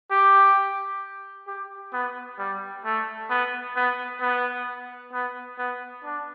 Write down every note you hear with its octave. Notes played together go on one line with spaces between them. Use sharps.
G4
G4
B3
G3
A3
B3
B3
B3
B3
B3
D4